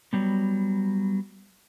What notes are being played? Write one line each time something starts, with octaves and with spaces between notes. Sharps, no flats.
F#3 G3 B3